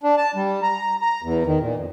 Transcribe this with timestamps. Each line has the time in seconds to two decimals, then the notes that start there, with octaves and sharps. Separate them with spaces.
0.03 D4
0.17 A5
0.35 G3
0.62 A#5
1.02 A#5
1.23 E2
1.47 D#3
1.61 A#2
1.76 F2